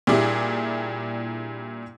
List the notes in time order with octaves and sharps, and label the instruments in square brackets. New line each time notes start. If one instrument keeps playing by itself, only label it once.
[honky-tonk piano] A#2 G3 D4 E4 G#4